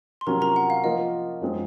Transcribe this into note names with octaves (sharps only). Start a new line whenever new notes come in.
C6
C3 F#3 C#4 F4 A#4 A#5
A#4 A#5
F#5
F5
F3 A#3 F4 A#4 D#5
F#2 F3 G#3 C4